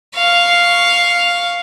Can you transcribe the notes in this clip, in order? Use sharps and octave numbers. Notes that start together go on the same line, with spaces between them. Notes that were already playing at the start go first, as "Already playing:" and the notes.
F5 C#6